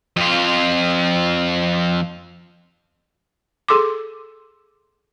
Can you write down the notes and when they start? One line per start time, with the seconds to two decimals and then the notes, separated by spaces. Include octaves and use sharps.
0.17 F2 F4
3.68 G#4 A4 C6 D6